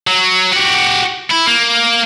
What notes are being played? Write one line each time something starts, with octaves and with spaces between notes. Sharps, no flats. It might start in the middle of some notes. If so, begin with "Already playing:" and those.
F#3
F#4 G4
E4
A#3